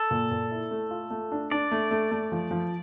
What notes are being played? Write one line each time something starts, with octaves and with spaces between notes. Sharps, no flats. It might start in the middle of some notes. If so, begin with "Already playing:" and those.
Already playing: A4
A#2
A#2
E4
A3
F4
A3
D4
D4 D5
A3
A3
A3
F3
F3